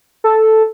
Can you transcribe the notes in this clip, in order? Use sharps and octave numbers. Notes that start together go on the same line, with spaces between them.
A4